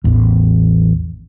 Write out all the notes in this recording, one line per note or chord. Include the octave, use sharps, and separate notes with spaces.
A1 E2